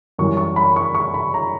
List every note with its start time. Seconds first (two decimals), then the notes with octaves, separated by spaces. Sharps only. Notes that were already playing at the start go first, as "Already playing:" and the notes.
0.18 F#2 E3 G3 C#6
0.37 C#6
0.56 B5
0.76 C#6
0.95 C#6
1.14 B5
1.34 A#5